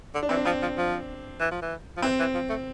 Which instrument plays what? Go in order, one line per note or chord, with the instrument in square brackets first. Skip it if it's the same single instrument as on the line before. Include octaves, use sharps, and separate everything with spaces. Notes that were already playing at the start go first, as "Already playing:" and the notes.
[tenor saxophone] D3
[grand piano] D4
[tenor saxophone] E3 [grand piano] C4
[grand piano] D4
[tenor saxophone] F3 [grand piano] C4
[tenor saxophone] F3
F3
E3
F3
E3
F3
[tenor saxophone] E3 [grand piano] C4
[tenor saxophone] E3
F3
A3